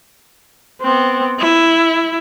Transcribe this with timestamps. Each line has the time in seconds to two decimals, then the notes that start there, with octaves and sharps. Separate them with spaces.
0.81 B3 C4
1.39 E4